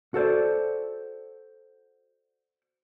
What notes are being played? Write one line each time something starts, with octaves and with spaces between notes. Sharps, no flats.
F#4 A4 C5 D5